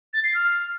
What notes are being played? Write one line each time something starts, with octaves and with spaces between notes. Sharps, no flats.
A6
C7
F6